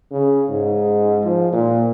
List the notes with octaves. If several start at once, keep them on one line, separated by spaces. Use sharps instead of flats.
C#3
G#2
F3
A#2